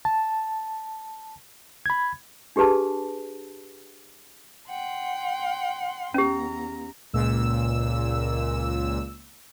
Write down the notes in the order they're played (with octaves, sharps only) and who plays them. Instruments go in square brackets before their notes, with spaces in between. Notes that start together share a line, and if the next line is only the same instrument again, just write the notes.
[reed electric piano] A5
B5 G#6
[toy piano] D4 G4 G#4 B4 A5
[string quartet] F#5 G5 C6
[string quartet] E2 A#5 [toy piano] C#4 G4
[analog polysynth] C#2 A#2 E6